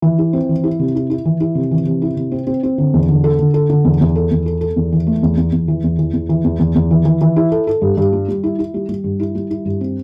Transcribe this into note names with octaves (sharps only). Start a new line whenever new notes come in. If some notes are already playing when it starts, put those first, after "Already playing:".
E3
E4
C4
E3
E4
C3
E4
E4
E3
E4
C3
E3
C3
E4
C3
C4
C4
C4
D3
E2
D3
A4
D3
A4
D3
E2
E2
A4
E2
A4
A4
E2
E3
A3
E2
E2
E2
E3
E2
E3
E2
E3
E2
E2
E2
E3
E3
E3
E4
A4
A4
G2
G2
G3
G3
E4
E4
G3
G3
G2
E4
G3
E4
G2
C4